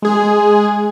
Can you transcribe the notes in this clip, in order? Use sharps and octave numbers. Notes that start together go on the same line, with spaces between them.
G#3 G#4